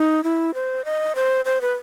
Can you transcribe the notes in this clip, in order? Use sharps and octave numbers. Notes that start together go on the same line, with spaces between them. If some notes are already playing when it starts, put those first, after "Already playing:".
Already playing: D#4
E4
C5
D#5
C5
C5
B4